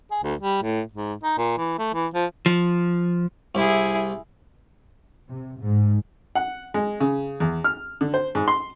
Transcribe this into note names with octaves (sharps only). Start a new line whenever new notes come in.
G#4
D2
G3
A2
G#2
D#4
A#2
E3
A3
E3
F3
F3
C2 E4 G#4
C3
G#2
F#5
G#3
C#3
E2
F6
D3
C5
G#2
C6